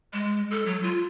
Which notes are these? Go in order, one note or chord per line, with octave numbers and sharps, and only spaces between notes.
G#3
A4
F#3
F4